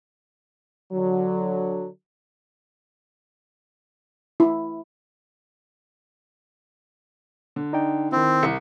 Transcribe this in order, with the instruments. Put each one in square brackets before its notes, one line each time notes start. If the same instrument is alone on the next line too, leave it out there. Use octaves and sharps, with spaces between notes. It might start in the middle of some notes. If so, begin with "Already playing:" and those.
[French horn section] D3 F#3
[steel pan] E4
[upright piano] D3
[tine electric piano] D#4 D5 G5
[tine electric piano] D#3 E4 [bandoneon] C4
[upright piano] C2 C#7